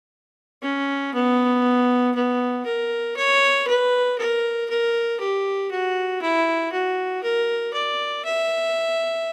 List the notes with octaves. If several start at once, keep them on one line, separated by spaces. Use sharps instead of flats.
C#4
B3
B3
A#4
C#5
B4
A#4
A#4
G4
F#4
E4
F#4
A#4
D5
E5